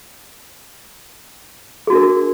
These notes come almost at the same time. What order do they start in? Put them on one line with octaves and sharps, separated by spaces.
G#4 F#4 D4 A#4